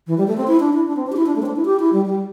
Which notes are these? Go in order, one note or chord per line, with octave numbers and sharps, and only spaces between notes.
E3
G3
A3
C4
E4
D4
E4
D4
C4
D4
G4
E4
D4
A3
C4
D4
E4
G4
E4
G3
G3